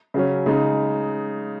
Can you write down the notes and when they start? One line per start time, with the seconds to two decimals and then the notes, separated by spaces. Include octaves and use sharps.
0.14 C#3 F#3 C#4
0.46 C#3 G#3 D#4